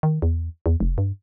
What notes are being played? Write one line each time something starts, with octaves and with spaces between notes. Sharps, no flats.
D#3
E2
E2
F1
G2